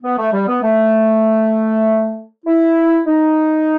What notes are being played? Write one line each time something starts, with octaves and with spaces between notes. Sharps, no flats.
B3
A3
G3
B3
A3
E4
D#4